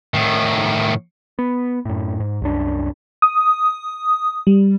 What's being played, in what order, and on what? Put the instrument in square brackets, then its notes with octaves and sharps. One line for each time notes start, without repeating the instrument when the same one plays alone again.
[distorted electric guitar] A2 D#3
[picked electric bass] B3
F#2 A2
G#2
C2 F#2 D4
[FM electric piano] D#6
G3